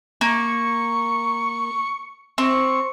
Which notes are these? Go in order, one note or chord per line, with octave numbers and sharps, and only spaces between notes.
A#3 C#6
C4 C#6